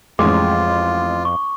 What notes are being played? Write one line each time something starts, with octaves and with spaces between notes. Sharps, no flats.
A1 F2 G#3 F4 D6
C#6